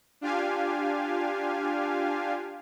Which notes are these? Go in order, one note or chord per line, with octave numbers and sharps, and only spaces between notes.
D4 F4 G4 F5 G#5